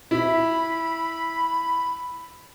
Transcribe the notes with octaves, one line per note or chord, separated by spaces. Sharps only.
E4 B5